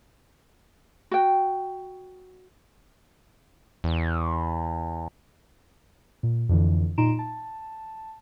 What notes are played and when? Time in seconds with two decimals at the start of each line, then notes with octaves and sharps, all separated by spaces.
1.11 F#4 G5
3.84 E2
6.23 A#2
6.49 F2 D3 E3
6.98 A#2 D#4 A#5 C6 D7 E7
7.19 A5